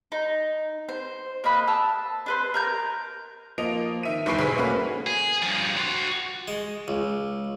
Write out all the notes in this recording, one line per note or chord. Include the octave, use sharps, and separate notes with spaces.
D#4
C5
A#3 D#5 B5 F#6
A5 E6
D4 B4 C5
A#4 A#5 G6
F3 A#3 D#5 D7 F7
D#3 E5 D#7
G1 E2 B5 C#6 C7 D7
B1 G#4 C5 B5 B6 C7
A3 A#3 C#4 F#4 B4
G#4
G2 F3
F#4 C6
G#3
C#2